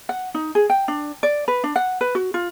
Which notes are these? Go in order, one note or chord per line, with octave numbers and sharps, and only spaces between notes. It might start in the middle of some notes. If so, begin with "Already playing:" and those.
F#5
D#4
G#4
G5
D4
D5
B4
D4
F#5
B4
F#4
F4